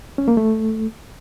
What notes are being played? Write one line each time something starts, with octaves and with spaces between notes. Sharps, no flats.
C#4
A#3
A3